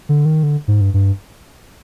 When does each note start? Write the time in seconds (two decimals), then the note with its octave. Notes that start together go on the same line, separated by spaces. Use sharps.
0.09 D3
0.25 D#3
0.43 D3
0.68 G#2
0.81 G2
0.94 G2